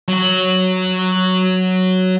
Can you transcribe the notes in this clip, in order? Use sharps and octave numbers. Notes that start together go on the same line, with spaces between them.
F#3 F#4